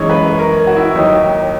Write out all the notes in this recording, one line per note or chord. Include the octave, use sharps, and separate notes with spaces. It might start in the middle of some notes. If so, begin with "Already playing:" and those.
Already playing: F#2 E3 G#3 C#5
B4
A#4
F#4
E4
D#2 D#3 F#3 D#4